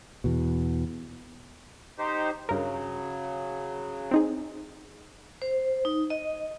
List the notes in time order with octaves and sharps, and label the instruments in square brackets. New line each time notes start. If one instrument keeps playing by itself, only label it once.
[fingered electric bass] E2 B2
[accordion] D#4 G4 C5
[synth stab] G2 A#4 [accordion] C#3 F#3
[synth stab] C4 D#4 G#4
[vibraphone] C5
D#4
D#5